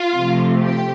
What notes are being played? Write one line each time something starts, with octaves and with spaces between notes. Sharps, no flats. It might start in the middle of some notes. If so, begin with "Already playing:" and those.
Already playing: F4
C3 F3 A3
G4